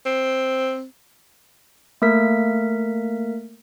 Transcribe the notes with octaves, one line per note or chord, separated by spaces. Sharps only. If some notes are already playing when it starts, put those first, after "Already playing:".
C4
A3 A#3 A#4 B6